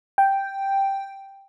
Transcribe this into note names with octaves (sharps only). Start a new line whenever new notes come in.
G5